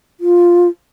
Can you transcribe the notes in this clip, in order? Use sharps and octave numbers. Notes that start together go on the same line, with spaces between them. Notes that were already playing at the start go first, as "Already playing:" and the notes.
F4